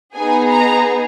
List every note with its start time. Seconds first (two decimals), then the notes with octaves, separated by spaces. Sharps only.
0.16 B3 D#4 G#4 G#5
0.50 A#5